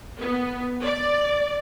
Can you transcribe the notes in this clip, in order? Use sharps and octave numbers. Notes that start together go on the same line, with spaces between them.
B3
D5